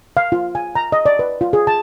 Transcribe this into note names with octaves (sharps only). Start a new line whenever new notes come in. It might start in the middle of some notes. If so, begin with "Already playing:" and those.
F5
F4
G#5
A#5
D#5
D5
B4
F4
G#4
A5